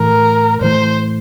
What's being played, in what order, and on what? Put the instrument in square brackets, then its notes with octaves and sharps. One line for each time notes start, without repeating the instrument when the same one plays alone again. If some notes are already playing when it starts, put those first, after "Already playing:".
Already playing: [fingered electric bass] A2 E3 A3 [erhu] A#4
[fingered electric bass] A2 E3 A3 [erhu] C5